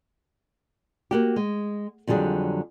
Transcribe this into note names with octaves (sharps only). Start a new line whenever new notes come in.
A#3 F#4 G4
G#3
F2 D3 F#3 G3 G#4